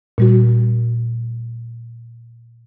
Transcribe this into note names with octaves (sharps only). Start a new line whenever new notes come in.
A#2 G3 F#4